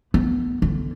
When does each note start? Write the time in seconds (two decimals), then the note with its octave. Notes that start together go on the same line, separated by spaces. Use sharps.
0.14 B3
0.62 D3